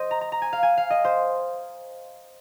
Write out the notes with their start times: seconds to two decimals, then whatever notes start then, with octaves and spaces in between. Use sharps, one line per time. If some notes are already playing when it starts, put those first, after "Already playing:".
Already playing: C5 D#5
0.11 A#5
0.21 A#5
0.32 A#5
0.42 G#5
0.53 F5
0.63 G#5
0.77 F5
0.90 D#5
1.05 C5